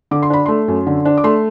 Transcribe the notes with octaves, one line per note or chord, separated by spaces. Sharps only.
D3 D6
C6
D4 B5
A3 C6
F#2
D3
D4
D6
A3 C6